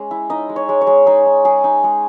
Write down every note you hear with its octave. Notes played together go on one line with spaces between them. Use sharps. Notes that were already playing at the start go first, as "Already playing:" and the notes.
Already playing: G#3 C#4
E4
D#4 D#5
G#3
C#5
G#3
C#5
G#3
D#4 G#4
D#4
G#3 G#4
D#4
G#3